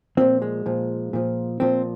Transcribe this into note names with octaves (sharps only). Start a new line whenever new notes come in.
A#2 F3 C4
G#3
A#2 F3
A#2 F3
A#2 F3 C4